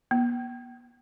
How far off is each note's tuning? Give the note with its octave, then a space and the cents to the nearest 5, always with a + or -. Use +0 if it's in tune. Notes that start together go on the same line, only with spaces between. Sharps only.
B3 -40